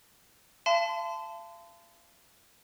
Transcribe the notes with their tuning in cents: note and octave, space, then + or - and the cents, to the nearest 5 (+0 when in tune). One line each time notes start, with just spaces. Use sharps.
F5 -40 A5 +0 C6 -35